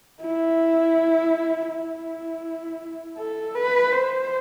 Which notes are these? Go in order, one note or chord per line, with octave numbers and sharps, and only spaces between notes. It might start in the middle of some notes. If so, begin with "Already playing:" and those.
E4
E4
A4
B4
C5